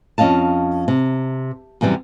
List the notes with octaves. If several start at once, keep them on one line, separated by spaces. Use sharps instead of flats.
F2 C#4 D#5 F5 A5
C3
F#2 C3 E3 G3 B3